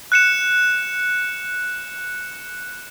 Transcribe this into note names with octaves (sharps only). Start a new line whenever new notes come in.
F#6 C#7 E7